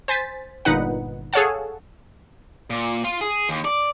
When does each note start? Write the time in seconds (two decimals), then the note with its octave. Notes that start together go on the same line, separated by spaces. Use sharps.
0.08 C5 G#5 A6 B6
0.65 G1 A#2 D#4 B4 F#5
1.33 G#4 A4 C#5 F5 F#5 A5
2.70 A#2
3.04 F4
3.21 G#4
3.49 D#2
3.65 D5